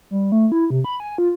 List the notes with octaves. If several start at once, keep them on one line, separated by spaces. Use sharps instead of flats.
G3
A3
E4
C3
B5
G#5
F4